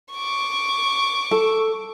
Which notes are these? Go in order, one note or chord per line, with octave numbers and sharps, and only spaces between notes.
C#6 D6
A4